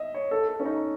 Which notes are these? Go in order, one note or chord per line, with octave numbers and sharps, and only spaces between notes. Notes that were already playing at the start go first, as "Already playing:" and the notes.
Already playing: D#5 E5
C#5
A4
A4
C#4
D#4